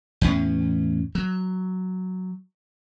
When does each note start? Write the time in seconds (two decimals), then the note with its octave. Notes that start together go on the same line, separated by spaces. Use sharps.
0.21 E2 A2 C#4
1.15 F#3